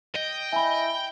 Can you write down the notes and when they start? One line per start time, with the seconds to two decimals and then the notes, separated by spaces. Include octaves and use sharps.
0.15 D#5 G5
0.53 E4 G#5 B5